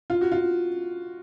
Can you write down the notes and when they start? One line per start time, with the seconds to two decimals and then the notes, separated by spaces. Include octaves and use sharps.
0.10 F4
0.21 F#4
0.32 F4